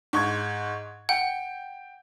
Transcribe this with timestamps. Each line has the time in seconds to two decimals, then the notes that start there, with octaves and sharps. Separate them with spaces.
0.13 G#2 C#6 G#6
1.09 F#5 G5